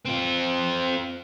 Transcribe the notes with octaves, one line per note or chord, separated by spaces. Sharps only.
C4 F4